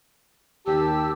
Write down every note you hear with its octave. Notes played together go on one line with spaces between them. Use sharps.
D#2 G4 A5 E6